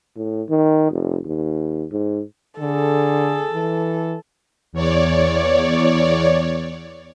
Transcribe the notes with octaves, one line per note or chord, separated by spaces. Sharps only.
A2
D#3
F1
D#2
G#2
D3 G#4 A4
E3
E2 C#5 D5